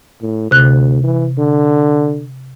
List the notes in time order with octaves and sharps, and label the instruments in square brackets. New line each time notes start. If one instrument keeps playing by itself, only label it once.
[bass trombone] A2
[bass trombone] D2 [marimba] C3 F#6
[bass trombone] E3
D3